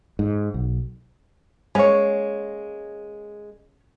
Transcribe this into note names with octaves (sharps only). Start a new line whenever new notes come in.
G#2
B1
G#3 A#3 C#4 C#5